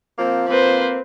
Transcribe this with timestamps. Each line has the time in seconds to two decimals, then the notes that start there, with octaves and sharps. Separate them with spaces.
0.19 F3 A#3 C4
0.49 A#3 C4 B4 C5